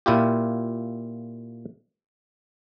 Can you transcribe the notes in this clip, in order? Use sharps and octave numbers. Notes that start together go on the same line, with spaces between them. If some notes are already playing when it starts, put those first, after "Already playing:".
A#2 E4 F4 G4